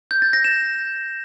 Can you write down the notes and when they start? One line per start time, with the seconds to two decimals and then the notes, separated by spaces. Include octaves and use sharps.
0.11 G6
0.22 A6
0.33 A#6
0.44 E7